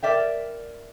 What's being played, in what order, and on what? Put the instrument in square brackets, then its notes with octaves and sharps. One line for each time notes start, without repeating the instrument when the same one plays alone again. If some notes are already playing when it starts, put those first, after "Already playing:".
[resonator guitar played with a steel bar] A#4 D5 E5 G5